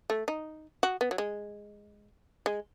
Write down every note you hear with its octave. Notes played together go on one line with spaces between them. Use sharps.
A3
D#4
F#4
B3
F#3
G#3
G#3